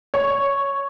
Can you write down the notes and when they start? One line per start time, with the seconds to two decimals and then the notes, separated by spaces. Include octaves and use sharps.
0.14 C#5